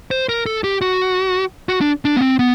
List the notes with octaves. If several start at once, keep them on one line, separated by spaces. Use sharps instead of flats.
C5
A#4
A4
G4
F#4
F#4
D4
D4
B3
C4
B3